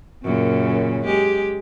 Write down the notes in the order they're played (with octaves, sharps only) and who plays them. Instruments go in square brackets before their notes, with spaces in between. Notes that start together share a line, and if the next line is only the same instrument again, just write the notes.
[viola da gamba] F#2 A#2 C#3
G#3 G4